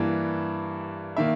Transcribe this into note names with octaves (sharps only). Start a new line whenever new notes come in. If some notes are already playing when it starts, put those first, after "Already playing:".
Already playing: G2 E3 A#3
D#3 A#3 E5